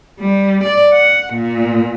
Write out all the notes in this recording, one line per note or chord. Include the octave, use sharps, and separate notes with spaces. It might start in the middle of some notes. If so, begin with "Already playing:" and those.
G3
D5
F#5
A#2